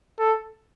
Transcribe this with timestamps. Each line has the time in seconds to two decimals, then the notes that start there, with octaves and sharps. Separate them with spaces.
0.19 A4